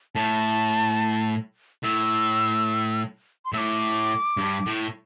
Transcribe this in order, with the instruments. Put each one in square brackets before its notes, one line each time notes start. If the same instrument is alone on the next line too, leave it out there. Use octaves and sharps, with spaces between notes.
[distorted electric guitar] A2 [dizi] A5
[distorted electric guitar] A2 [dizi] E6
[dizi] C6
[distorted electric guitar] A2 [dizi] E6
[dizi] D6
[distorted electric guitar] G2
A2